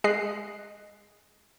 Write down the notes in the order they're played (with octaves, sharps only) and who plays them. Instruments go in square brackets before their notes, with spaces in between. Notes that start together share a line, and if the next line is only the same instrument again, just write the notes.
[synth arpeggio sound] G#3 D#5 F#6 C7